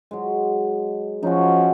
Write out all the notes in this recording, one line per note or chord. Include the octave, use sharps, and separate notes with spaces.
F#3 G#3
F3 C#4 D#4 F#4